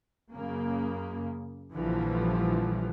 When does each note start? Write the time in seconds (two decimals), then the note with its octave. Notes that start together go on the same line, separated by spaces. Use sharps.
0.33 F#2 C#3 A#3
1.74 A#1 D3 E3 F3 G3